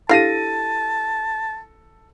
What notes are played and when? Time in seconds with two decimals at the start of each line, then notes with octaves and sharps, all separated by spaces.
0.09 D4 E4 G4 A4 F5 A5 A#6 D#7